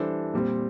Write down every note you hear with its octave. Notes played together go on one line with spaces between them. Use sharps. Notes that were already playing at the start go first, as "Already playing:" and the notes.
Already playing: E3 G3 D4 A4 C5
A#2 G3 C4